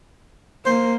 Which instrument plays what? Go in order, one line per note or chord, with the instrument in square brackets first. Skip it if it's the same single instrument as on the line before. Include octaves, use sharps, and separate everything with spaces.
[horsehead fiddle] A#3 [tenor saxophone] C5